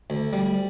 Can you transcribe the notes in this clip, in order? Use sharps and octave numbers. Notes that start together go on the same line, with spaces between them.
D2
G3